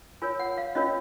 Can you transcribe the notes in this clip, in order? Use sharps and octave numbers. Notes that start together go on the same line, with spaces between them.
F4 A#4 C#5 G#5
F#5
F5
C#4 F4 A#4 C#5 D#5